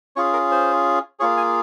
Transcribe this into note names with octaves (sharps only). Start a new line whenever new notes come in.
C#4 F4 G#4 C#5
A#4
C5
A#3 F4 G#4 C#5
G#5